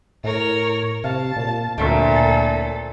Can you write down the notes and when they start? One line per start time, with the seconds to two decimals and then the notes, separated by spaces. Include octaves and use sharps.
0.24 A2 A#4 C#5
1.04 C3 F5 A5
1.36 A#2
1.78 D2 A#2 C4 C#4 E4 A4